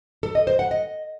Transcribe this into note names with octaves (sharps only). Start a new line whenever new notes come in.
A4
D#5
C5
F#5
D#5